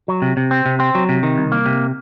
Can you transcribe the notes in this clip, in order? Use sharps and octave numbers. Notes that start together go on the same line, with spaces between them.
F#3
C3
C3
C4
C3
C4
F#3
C3
D#3
C2
A#3
C3